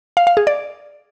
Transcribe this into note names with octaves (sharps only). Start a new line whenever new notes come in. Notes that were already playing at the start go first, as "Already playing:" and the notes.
F5
F5
G#4
D5